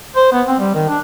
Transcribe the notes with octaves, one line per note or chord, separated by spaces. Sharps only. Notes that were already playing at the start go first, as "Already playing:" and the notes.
C5
B3
C4
G3
D#3
D4